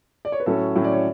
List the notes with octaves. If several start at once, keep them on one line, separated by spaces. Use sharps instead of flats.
D5
C#5
B4
A2 F#3 C#4 A4
A2 F#3 C#4
D5
C#5